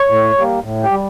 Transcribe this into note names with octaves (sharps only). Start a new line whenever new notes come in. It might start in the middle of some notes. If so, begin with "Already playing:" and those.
Already playing: C#5
A2
G3 A#3
A2
G4
G3